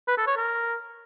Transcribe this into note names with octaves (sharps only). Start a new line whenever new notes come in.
B4
A4
C#5
A#4